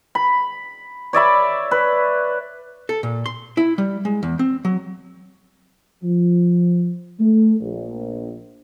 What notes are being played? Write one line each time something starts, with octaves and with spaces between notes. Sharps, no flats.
B5
C#5 D5 E5 B5
B4
A4
A#2
C6
E4
G3
G#3
E2
C4
F#3
F3
A3
A#1